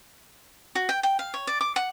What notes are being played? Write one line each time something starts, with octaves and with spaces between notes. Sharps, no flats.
F#4
G5
G5
F5
C#5
D5
D6
F#5